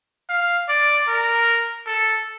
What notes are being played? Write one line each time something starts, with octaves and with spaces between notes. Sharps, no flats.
F5
D5
A#4
A4